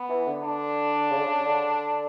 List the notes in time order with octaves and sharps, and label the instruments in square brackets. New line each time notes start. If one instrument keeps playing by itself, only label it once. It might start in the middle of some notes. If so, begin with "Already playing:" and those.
Already playing: [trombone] B3
[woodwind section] E3
D3
[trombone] D4
[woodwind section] C#3
D3
C#3
D3